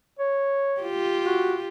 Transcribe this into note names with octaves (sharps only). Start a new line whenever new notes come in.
C#5
F4 G4
F#4